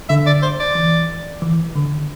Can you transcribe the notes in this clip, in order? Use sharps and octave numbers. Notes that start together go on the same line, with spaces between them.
D3 E5
D5
C5
D5
E3
E3
D3